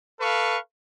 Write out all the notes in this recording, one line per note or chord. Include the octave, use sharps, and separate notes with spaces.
A4 B4 F5 C#6